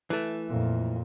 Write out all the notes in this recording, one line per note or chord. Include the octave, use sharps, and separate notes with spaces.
E3 A3
F2 A#2